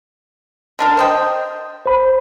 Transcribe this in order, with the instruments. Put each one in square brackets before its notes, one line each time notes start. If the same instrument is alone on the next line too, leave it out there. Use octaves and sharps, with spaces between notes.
[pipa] D3 D4 A#4
C5 D#5 G5
[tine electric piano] C5 B5